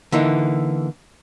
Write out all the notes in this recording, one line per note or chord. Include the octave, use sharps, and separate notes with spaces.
D3 E3 A#3 D#4